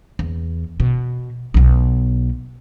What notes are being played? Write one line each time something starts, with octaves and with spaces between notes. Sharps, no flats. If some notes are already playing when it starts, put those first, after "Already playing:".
E2
B2
B1 B3